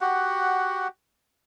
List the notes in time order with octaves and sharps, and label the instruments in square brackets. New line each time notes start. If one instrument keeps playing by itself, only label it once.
[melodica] F#4 G4 F#5